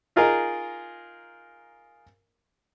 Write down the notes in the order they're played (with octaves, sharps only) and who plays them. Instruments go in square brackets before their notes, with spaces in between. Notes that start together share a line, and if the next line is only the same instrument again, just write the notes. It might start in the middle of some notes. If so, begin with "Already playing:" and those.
[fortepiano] D#4 F4 G#4 A#4